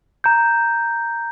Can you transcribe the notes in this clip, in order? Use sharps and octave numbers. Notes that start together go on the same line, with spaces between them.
A#5 G6